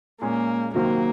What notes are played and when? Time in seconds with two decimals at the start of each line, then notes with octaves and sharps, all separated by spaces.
0.22 A#2 G#3 A#3 C#4 G#4
0.74 C3 D#3 F#3 A#3 C4 F#4